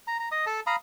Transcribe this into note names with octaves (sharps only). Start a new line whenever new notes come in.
A#5
A#5
D#5 D#6
A4 A5
F5 A#5 B5 D#6